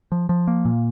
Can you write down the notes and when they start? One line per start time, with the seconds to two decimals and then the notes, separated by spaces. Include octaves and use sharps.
0.12 F3
0.29 F3
0.47 A#3
0.65 A#2